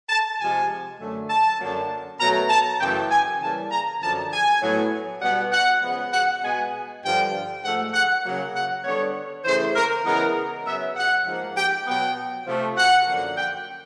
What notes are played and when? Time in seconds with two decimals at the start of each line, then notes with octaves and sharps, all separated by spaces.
0.09 A5
0.38 C3 F3 G#3 G#5
0.99 F#2 D3 F#3 A3
1.30 A5
1.59 F#2 D3 F#3 A#3
2.19 B2 F#3 A3 A#5
2.49 A5
2.79 F#2 C#3 E3 A3 G5
3.11 G#5
3.41 C#3 E3 G3 A#3 A5
3.71 A#5
4.01 F#2 D3 F3 A5
4.32 G#5
4.62 A2 F#3 B3
5.21 B2 G3 B3 F#5
5.52 F#5
5.82 C#3 F3 G#3 B3
6.12 F#5
6.42 B2 G#3 B3 G#5
7.03 G2 D3 F3 G5
7.64 G#2 F3 A3 F#5
7.93 F#5
8.24 C#3 F#3 A#3
8.55 F#5
8.84 D3 G3 B3 C#5
9.45 C#3 E3 A3 C5
9.75 A#4
10.05 C#3 E3 G#3 B3 A#4
10.66 C#3 F#3 B3 E5
10.97 F#5
11.26 G#2 F3 A#3
11.57 G5
11.87 B2 F#3 B3 G5
12.47 C3 F3 A3
12.78 F#5
13.07 F#2 D3 F3 A#3
13.38 G5